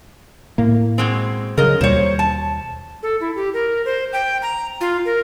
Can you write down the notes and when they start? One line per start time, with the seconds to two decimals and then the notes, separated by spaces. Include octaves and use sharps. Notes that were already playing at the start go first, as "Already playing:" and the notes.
0.58 A2 A#3
0.98 B2 G#3 C4
1.57 C#3 F#3 A#4 D#5
1.81 D#2 B2 G3 C5 C#5
2.19 A5
3.03 A4
3.21 E4
3.36 G4
3.54 A#4
3.85 C5
4.13 G5
4.42 A#5
4.81 F4
5.05 A#4